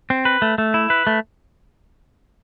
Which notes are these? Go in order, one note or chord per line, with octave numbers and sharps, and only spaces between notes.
C4
B4
A3
A3
E4
B4
A3